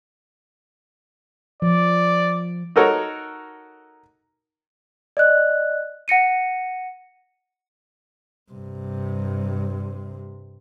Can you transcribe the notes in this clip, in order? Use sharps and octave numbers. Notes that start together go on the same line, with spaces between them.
F3 D5
D#4 F#4 A4 A#4 C#5
D5 D#5 F#6
F#5 A#6 C#7 D#7
G2 C3